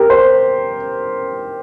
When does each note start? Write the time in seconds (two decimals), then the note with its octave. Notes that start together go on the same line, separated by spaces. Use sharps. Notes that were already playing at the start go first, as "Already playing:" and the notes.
Already playing: G4 A#4
0.10 C5